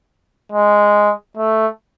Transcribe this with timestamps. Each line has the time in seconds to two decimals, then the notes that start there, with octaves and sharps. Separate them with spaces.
0.52 G#3
1.37 A3